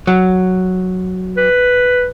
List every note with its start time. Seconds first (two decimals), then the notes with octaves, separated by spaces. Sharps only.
0.07 F#3
1.37 B4